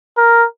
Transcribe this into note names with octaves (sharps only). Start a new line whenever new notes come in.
A#4